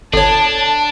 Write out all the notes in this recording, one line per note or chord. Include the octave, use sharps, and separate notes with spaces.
G1 D4 A4 C#5 A5